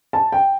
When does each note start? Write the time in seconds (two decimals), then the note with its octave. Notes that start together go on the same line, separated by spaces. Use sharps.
0.13 A5
0.32 G5